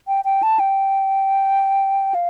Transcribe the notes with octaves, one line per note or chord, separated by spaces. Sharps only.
G5
G5
A5
G5
F5